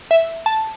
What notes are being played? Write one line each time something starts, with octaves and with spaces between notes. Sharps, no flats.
E5
A5